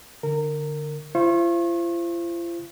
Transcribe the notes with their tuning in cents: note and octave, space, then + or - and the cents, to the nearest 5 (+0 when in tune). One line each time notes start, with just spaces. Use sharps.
D3 +0 A#4 -20
F4 -45 C5 +0 C#6 -40